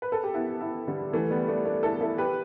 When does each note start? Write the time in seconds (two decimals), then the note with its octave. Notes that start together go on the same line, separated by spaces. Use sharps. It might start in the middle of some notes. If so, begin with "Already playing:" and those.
0.02 B4
0.12 A4
0.23 G4
0.34 B3 E4
0.61 B3 E4
0.87 D3 G3
1.13 E3 A3
1.30 G3 B3
1.48 A3 D4
1.65 A3 D4
1.83 E4 A4
2.01 E4 A4
2.18 G4 B4